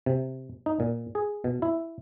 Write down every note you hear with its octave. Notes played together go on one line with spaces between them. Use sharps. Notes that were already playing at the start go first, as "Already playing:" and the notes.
C3
D#4
A#2
G#4
B2
E4